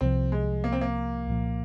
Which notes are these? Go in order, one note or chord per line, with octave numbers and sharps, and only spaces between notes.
C2 C3 F3 C4
G#3
A#3
C4
A#3
C2 A#2 F3